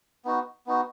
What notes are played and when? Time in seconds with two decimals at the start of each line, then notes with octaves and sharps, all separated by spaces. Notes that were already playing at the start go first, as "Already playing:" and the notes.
0.25 B3 D#4 F#4
0.67 B3 D#4 F#4